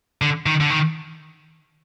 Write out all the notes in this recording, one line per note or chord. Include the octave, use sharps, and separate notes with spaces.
D3
D#3
D3
D#3